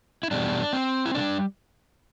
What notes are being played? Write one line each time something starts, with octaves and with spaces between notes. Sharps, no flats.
E4
E2 B2 G3 D4
C4
E4
C3 G3 D4